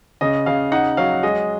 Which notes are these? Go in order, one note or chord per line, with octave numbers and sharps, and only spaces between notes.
C#3 D#5
C#3 F5
D#4 F#5
F#3 F5
G#3 D#5